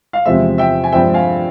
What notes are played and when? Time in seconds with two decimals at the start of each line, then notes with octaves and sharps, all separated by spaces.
0.13 F5
0.25 E2 C3 F3 G#3 C4 E5
0.58 E5 G5
0.84 G#5
0.92 G2 F3 G#3 C4 E5 G5
1.14 F5 G#5